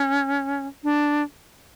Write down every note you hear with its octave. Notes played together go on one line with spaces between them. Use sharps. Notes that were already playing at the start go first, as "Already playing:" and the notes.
Already playing: C#4
D4